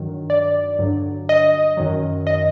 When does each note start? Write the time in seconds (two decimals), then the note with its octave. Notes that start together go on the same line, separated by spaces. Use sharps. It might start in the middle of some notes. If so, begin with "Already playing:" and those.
Already playing: G2 D#3 F#3
0.30 D5
0.79 G2 D3 F#3
1.29 D#5
1.77 F#2 D#3 F#3
2.27 D#5